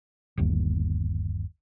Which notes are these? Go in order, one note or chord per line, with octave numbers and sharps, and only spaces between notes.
G1 D#2